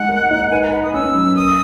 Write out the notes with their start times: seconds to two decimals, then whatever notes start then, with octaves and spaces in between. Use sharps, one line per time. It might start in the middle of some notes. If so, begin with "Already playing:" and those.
Already playing: G#3 D#4 F#5
0.09 A#4
0.31 D#4
0.51 B4 G#5
0.62 A#5
0.72 B4 B5
0.83 D#6
0.94 C#4 E6
1.14 F#3
1.36 A#4 D#6